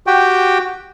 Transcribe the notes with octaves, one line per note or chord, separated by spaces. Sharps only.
F#4 G4 G5